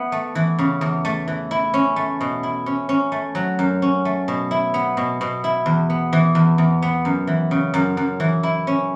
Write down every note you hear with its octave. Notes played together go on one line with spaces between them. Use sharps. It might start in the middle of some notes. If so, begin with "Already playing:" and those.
Already playing: B3 E4
A3
E3
C#3
E2
A3
E3
E4
C#4
A3
B2
E4
C#4
C#4
A3
F#3
F#2
C#4
A3
B2
E4
B3
B2
B2
E4
E2
B3
E3
E2
E2
B3
F#2
E3
C#3
F#2
F#2
E3
E4
C#4